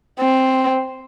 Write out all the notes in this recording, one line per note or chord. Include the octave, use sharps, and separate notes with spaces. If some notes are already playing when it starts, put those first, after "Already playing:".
C4